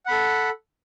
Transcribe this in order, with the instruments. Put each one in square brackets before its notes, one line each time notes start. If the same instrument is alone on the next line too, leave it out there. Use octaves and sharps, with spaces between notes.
[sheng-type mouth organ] F#5
B5
A4